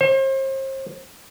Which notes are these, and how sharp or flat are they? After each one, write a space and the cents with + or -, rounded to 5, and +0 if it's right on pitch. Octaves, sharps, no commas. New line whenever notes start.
C5 +40